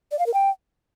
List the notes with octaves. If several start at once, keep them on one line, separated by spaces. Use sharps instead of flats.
D5
F5
A#4
G5